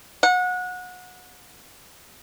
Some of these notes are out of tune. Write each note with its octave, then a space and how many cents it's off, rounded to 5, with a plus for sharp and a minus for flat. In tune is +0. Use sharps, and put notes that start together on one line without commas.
F#5 -25